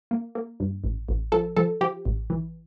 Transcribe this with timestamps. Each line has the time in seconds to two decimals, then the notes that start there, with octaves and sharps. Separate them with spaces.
0.11 A#3
0.35 A#3
0.60 G2
0.84 A1
1.09 A1
1.32 F3 A4
1.56 F3 A4
1.81 F3 G4
2.05 A1
2.30 E3